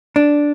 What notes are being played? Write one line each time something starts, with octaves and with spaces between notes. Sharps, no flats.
D4